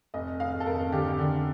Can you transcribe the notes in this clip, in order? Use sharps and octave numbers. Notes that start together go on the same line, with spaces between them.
F1 D#5
F1 F5
A4
F1 A#4
D3 G4
G4
D3